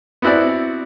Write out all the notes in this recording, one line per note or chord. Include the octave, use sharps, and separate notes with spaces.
B3 C4 E4 F#4 D5